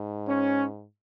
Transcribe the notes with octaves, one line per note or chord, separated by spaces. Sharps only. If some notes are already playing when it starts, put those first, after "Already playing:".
Already playing: G#2
C#4